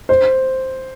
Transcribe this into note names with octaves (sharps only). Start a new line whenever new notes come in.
C5